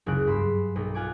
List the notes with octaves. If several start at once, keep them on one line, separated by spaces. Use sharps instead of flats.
F#1 C#2 C#3 F#6 D7
G2 B5 C6 E7
B1 A#3 B3
F4 F#5 G#5 D6